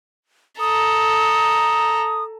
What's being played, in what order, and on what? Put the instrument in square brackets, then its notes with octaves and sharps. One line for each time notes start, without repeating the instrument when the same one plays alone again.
[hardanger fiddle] A4 A#5 [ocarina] D#6